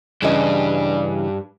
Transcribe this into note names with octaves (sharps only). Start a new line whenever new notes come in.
G2 C#3 E3 D4 D#5